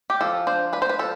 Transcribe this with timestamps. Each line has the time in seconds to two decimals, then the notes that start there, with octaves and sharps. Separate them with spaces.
0.10 G4
0.21 F3 A4
0.47 D4 C5
0.73 D4 B4
0.82 C5
0.89 B4
0.99 F3 A4